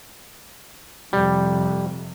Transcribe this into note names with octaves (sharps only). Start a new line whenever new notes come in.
F2 C3 G3